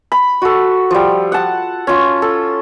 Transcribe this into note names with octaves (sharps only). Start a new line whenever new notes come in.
B5
F#4 A4
F3 G3
F#5 A5
C#4 F4
A4